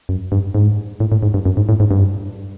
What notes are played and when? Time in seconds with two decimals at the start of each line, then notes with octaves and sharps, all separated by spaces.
0.09 F#2
0.32 G2
0.55 G#2
1.00 A2
1.12 A2
1.23 G#2
1.34 G2
1.45 F#2
1.57 G#2
1.69 A2
1.80 G#2
1.91 G2